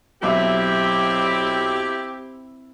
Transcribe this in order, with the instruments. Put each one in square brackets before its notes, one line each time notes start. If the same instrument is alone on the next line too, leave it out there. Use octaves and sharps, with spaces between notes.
[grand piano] B1 E5 D6 [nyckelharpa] C4 E4 [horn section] G4